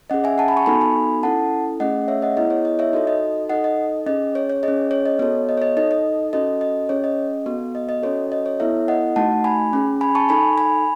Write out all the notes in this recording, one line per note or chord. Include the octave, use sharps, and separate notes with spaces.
C#4 G#4 D#5 F#5
E5 G#5
F#5 A5
G#5 B5
A5 C#6
B3 D#4 F#4 A4 G#5 B5
G#5 B5
C#4 E4 A4 F#5 A5
A3 C#4 G#4 D#5 F#5
C#5 E5
D#5 F#5
B3 E4 G#4 D#5
C#5
D#5
C#5 E5
D#4 F#4 A4 D#5
D#5
D#4 A4 D#5 F#5
D#5
C#4 G#4 D#5
C#5
C#5
C#4 G#4 D#5
C#5
D#5
B3 F#4 A4 C#5
D#5
C#5
D#5
D#4 A4 D#5
D#5
C#4 F#4 A4 D#5
D#5
C#4 G#4 C#5
D#5
B3 F#4 A4
D#5
D#5
C#4 F#4 A4 C#5
D#5
C#5
B3 E4 A4 C#5 E5
D#5 F#5
A3 D#4 F#4 F#5 A5
G#5 B5
C#4 G#4
G#5 B5
A5 C#6
D#4 A4 G#5 B5
G#5 B5